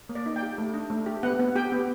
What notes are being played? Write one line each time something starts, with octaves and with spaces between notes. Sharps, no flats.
A#3
D5
D#4
G5
G4
A3
D4
A3
G4
B3 F#5
B3
G4 G5
B3